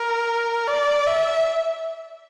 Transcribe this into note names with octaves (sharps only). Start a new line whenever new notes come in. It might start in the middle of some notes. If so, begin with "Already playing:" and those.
Already playing: A#4
D5
E5